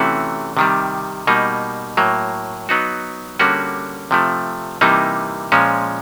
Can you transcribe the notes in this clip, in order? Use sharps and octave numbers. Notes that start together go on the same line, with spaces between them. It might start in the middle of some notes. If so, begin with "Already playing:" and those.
Already playing: C3 E3 A3 C#4 F#4
C3 D#3 G3
B2 G3 A#3 D#4
A2 F#3 A#3
F#3 B3 D#4 F#4
D3 G3 A#3 C#4 F#4
C3 F3 A3
C3 E3 G3 A#3 D#4
A#2 F3 G#3 C#4